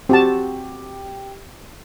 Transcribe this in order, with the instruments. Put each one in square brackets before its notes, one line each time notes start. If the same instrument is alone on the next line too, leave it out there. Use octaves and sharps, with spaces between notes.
[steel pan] C4 F#4 A5 [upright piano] G4